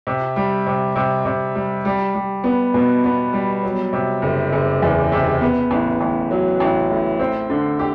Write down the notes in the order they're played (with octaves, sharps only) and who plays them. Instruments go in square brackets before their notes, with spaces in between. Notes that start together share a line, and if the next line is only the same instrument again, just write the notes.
[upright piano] C3
G3
C3
C3
C3
G3
G3
G3
B3
B2
B3
G3
F#3
C3
F#1
F#1
E2
C3
B3
A1
A1
F#3
A1
A2
C4
D3
G4